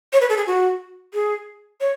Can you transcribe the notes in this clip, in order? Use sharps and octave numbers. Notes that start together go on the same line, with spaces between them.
C#5
B4
A4
G#4
F#4
G#4
C#5